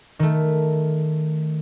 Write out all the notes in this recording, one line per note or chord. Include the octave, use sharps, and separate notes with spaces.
D#3 A3